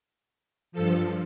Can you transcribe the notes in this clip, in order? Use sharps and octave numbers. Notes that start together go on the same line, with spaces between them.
G2 F3 A4